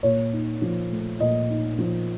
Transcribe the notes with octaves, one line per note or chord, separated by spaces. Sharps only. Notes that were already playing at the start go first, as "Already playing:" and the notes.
A#2 C#5
D#4
F3
A3
A#2 D#5
D#4
F3